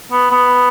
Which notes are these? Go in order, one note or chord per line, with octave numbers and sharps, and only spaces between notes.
B3
B3